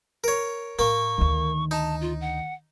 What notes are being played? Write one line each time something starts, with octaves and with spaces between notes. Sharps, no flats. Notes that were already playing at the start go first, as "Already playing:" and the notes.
A#4 C#5
A2 A#3 C#6
D2 D#3
D#4 A5
F4
F#5